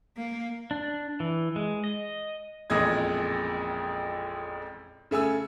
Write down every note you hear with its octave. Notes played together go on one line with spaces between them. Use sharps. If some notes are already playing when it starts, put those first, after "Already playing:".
A#3
D4
E3
G#3
D#5
A1 F2 A#2 G#3 D#5 G#6
C#3 A3 G#5 E6